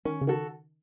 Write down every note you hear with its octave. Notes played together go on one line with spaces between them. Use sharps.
D#3 C#4
C#3
D#3 F#4 A4